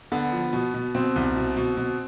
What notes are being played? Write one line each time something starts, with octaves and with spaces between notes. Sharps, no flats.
D3 B3
F3
B2
B2
B2 C4
C2
B2
B2
B2